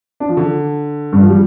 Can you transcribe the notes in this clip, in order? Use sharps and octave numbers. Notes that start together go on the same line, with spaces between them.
D4
F3
D3
G2
F3
G3